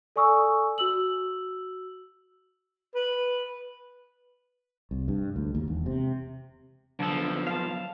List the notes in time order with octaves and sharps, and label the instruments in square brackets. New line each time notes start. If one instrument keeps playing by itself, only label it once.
[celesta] A4 D5 G#5 C#6 D#6 E6
F#4 E6 F#7
[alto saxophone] B4
[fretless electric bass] C2
G2
D2
D#2
E1
C3
[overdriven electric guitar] B1 F3 [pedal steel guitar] D3 A4
[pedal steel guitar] F5 A5